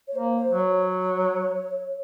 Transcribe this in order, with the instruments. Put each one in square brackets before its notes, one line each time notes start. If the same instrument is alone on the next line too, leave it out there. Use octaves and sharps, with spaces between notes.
[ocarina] C#5
[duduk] A#3 [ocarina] C5
[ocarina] C5
[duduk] F#3
[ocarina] C#5